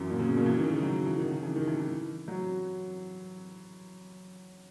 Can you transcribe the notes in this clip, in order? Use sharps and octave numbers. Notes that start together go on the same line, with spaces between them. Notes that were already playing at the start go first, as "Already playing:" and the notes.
Already playing: F#2 E3
A#2
C#3
B2
A#2
E3
C#3
D#3
D#3
F#3
E3
D#3
C#3
E3
D#3
E3
E3
F#3